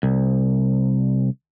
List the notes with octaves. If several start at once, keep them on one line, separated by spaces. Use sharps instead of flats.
C2